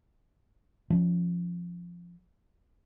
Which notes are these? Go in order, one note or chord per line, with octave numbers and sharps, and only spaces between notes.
F3 C#4